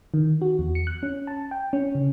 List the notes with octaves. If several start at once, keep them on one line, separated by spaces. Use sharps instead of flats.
D#3
F#4
E2
C#7
F#6
C#4
A5
G5
C#4
C#3